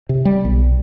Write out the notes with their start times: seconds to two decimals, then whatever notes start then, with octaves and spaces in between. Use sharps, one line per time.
0.09 C3
0.25 G3
0.45 B1